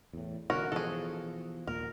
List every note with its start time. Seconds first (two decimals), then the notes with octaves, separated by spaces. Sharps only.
0.13 E2 A2
0.50 B2 D3 E3 C#4 F#4 A#4
0.72 B2 E3 F3 G#4 A4
1.67 D#2 A#2 A#4